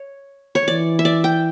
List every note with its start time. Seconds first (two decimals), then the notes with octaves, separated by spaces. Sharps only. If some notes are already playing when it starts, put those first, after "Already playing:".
Already playing: C#5
0.55 C#5
0.67 E3 D5
0.99 E5
1.05 D5
1.24 G5